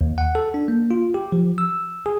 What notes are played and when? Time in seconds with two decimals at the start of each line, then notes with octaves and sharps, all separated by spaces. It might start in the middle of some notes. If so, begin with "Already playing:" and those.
0.01 D#2
0.18 F#5
0.35 A4
0.54 D4
0.68 A#3
0.91 F4
1.14 G4
1.32 F3
1.58 E6
2.06 G#4